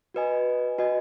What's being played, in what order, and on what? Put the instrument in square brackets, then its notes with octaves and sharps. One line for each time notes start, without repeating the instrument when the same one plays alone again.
[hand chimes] F#4 B4 D#5 G#5
F#4 B4 D#5 G#5